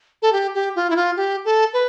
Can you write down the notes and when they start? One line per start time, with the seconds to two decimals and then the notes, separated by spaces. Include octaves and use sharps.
0.22 A4
0.33 G4
0.54 G4
0.76 F4
0.90 E4
0.96 F4
1.17 G4
1.45 A4
1.73 B4